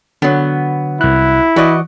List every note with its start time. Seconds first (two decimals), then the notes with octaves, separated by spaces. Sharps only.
0.22 D3 F#3 B3
1.01 C2 E4 F#6
1.56 E3 F#4 D5 D#5